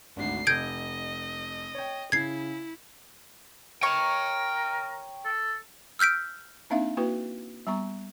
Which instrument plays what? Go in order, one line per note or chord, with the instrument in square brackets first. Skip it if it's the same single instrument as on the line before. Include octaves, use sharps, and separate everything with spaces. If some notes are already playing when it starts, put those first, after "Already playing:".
[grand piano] G#1 D2 [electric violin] D4 C7
[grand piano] F1 [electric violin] D#5 [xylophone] G6 G#6 D7
[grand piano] C#5 G5
[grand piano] C#3 [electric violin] E4 [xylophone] G#6 C7
[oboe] A#4 [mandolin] C#5 C#6 [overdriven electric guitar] G5 A#5
[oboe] A4
[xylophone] E6 F6 G6 B6 D7
[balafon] A#3 C4 D4 D#4 E5 F5
A#3 E4 F#4 B4
G3 B3 A#5 C#6